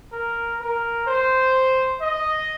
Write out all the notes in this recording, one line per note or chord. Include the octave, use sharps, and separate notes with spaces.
A#4
A#4
C5
D#5